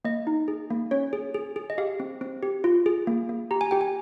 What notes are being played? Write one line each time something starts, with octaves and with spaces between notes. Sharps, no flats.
A#3 D#5
D#4
G#4
A#3
C#4 C#5
G#4
G#4
G#4
D#5
G4 F5
C4
C4
G4
F4
G#4
A#3
A#3
G4 A#5
G#5
G4 G5
G#5